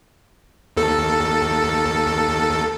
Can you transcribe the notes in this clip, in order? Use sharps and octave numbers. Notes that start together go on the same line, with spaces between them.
D#2 A4